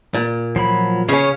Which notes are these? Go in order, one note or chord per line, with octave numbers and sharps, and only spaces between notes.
A#2
F3 F#3 B5
C#3 C#4 C#5 F5